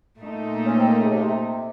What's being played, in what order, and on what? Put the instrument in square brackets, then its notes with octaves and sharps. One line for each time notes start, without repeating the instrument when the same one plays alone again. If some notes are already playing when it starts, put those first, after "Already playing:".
[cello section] A#2 A3 D#4
[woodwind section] C#4
C4
A#3
C#3
C3
C3